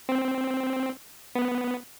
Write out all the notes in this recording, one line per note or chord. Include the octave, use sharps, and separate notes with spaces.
C4
B3